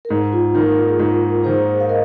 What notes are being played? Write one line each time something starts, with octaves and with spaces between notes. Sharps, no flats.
A#4
G#2 D#4 G#4
F4
D#3 A#3 D#4
F4
G#4
G#2 F4 A#4
D#3 A#3 G#4 C5
F5
A#4 D#5